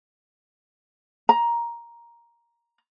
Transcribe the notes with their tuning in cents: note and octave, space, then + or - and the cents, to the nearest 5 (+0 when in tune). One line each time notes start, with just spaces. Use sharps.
A#5 +10